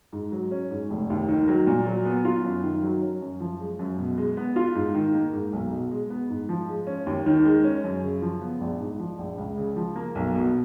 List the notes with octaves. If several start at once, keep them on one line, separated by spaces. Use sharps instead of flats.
G#2
F#3
C#4
G#2
F1
D#2
D#3
F#3
A#2
F#3
B3
F4
F#2
D#3
F#3
C#4
F#2
F3
G#3
F#2
B2
G#3
B3
F4
G#2
D#3
A#3
G#2
B1
B2
G#3
B3
G#2
F3
G#3
C#4
D#2
D#3
G#3
C#4
F#2
C#3
F3
B3
A#1
G#2
F3
A#1
C#2
C#3
F3
A#3
B1
B2